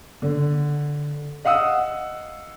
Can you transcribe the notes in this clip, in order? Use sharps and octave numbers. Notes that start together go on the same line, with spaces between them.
D3
D#5 F5 F#5 D#6 E6